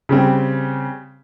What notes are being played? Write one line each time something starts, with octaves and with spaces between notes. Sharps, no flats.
C#3 G3 C4